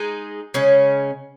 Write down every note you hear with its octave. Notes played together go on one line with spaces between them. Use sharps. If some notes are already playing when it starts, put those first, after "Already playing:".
Already playing: G#3 D#4 G#4
C#3 G#3 C#4